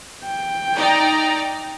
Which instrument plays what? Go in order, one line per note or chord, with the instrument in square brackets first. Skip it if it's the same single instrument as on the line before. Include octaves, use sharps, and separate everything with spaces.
[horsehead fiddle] G5
[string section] D#4 D5 A#5